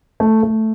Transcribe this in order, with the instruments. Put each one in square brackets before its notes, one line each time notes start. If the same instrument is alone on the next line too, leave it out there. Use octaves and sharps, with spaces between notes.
[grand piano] A3
A3